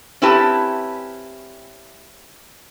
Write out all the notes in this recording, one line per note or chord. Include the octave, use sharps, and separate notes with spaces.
C4 C#4 E4 G4 B4 A5